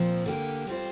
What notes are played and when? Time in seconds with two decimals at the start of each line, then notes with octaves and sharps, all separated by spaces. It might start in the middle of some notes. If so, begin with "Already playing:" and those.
Already playing: A#2 F3 C4
0.26 D3 A#3 G4
0.67 G3 C4 F4 C5